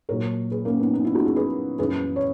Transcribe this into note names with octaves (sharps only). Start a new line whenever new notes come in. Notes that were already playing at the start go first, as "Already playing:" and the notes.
A#2 F#3 A#4 C#5
G#4 B4
A#3 C#4
B3 D#4
B3 D#4
C#4 E4
D#4 F#4
E4 G#4
G#4 B4
F#2 C#3 E3 G#4 B4
C#5